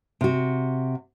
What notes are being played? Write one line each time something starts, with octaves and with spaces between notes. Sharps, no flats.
C3 F#4